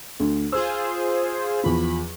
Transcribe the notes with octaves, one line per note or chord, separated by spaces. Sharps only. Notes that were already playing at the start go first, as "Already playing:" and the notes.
D2
F4 G#4 C5 E6
E2 F3 B5